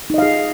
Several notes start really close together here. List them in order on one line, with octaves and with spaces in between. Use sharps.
D#4 D#5 F5 G#4